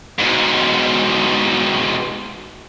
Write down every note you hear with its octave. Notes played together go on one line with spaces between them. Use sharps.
G#2 B2